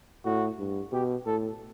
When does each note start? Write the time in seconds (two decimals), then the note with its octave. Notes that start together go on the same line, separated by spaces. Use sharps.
0.25 A2 F#4
0.59 G2
0.92 B2 G4
1.26 A2 A4